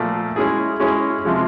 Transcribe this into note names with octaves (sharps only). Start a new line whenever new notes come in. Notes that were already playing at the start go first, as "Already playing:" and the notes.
Already playing: A#2 F3 A3
G#3 C#4 E4 G#4
G#3 C#4 E4 G#4
C3 F3 G#3